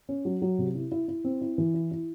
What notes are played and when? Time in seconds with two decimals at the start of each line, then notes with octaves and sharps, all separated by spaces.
0.09 C#4
0.25 F#3
0.42 F#3
0.58 C3
0.75 E4
0.92 E4
1.08 E4
1.24 C4
1.41 E4
1.58 E3
1.74 E4
1.91 E4